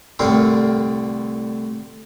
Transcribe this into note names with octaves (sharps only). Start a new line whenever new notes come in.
C2 A2 D3 C4 A#4 C6